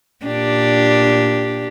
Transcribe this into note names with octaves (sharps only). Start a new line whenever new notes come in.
A#2 D4 G4